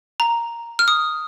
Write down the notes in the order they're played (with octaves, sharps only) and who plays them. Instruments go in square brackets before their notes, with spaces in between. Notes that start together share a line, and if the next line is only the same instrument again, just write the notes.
[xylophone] A#5
F6
D#6